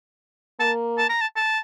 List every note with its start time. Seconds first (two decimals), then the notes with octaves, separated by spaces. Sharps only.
0.60 A#3 A5
0.98 A5
1.10 A#5
1.21 A5
1.36 A5